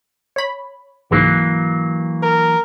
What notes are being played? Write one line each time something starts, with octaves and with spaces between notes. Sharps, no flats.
C#5 B5
C#2 G#2 E3 F#3 A#3
A#4